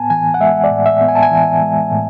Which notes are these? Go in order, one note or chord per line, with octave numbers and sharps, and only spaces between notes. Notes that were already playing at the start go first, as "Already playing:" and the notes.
Already playing: A2 B3 G#5 A5
E3 G#5
F#5
G#3 E5
D5
A2
E5
B3
G#5
A5
G#5
E3
G#3
A2